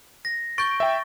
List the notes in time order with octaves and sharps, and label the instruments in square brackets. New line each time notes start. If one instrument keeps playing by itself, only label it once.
[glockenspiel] A#6
[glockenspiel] C#6 G6 G7 [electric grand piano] A6 D7
[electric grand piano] E5 G5